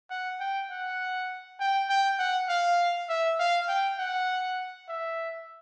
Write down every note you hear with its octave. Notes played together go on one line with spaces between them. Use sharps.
F#5
G5
F#5
G5
G5
F#5
F5
E5
F5
G5
F#5
E5